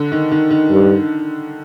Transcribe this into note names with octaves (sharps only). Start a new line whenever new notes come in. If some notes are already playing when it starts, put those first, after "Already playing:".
Already playing: D3
D#3
D#3
D#3
G2